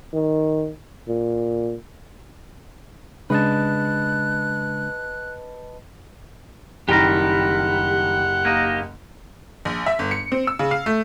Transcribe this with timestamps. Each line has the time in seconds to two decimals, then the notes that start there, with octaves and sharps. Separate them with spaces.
0.13 D#3
1.08 A#2
3.30 C#3 G#3 D4 B4 D#5 A5 F#6
6.89 F#1 D#3 G3 G4 A#4 F#5
8.45 A#3 D#4
9.65 A#1
9.86 E5
9.99 G1
10.11 C#7
10.32 C4
10.47 E6
10.59 C#3
10.71 F5
10.86 A3